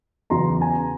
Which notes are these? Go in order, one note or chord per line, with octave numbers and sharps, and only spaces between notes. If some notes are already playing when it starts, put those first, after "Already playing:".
E2 C#3 F#3 A#5 C6
G#5 A#5